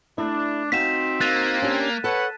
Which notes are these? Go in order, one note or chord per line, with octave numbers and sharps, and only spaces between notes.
A3 D4 E4
C4 D#4 F#4 F5 B6 E7
A#3 F#6 A6 D#7
C#4 D4 G4
A4 B4 C#5 F#5